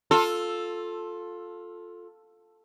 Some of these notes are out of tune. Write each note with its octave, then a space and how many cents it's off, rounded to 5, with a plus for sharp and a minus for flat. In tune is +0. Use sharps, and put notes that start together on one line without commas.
F4 +15 A4 +0